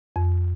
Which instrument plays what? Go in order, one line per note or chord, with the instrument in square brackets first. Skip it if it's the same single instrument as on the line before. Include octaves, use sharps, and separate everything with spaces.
[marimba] F2